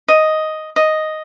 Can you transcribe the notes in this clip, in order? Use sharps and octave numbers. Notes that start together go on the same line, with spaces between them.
D#5
D#5